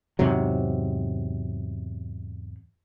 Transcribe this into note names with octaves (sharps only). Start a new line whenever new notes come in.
E2 G#2 C3 F#3